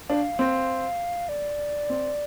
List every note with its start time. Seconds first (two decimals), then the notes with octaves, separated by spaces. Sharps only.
0.09 D4 F5
0.39 C4
1.29 D5
1.90 C4